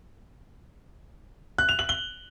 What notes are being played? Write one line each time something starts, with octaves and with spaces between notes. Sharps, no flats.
F#6
F7
F#7
G7